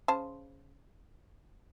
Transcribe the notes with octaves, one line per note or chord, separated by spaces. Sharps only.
C#3 C5 A5